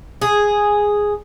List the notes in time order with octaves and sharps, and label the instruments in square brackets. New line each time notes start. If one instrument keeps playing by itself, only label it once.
[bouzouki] G#4